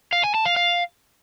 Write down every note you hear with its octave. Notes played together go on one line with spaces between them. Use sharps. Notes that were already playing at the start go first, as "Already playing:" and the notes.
F5
G#5
A5
F5
F5